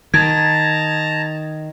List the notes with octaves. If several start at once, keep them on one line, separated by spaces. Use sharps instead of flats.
D#3 A5 A#5 G#6